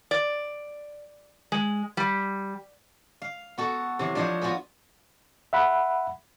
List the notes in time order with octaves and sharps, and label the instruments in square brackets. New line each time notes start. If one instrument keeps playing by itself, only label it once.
[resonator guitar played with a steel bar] D5
G#3
G3
[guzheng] F5
B3 F#4 A4
C3 E3 F#3
F3 D4 C5 C#5 D#5
B3 F4 F#4 G#4 B4
[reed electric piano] E5 F#5 B5